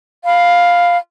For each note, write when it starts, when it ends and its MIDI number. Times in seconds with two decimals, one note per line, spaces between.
0.25 0.97 77
0.25 0.97 83